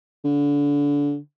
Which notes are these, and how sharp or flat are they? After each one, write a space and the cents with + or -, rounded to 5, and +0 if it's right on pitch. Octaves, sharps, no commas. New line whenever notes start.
D3 -30